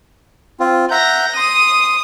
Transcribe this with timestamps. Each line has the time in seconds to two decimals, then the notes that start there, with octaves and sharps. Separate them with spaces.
0.60 C4 F4
0.91 E5 F#5 A#5 G6 A#6
1.37 C6 D#6